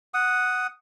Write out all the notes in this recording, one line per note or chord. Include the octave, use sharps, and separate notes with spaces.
F#5 D#6